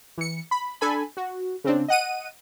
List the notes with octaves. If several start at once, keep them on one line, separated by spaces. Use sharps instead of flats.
E3 C#7
B5
D4 A4 G#5 B5
F#4
C#3 C4 D4
D#5 F#5 D#7